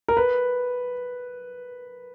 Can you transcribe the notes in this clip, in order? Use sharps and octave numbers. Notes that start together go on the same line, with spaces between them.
A#4
B4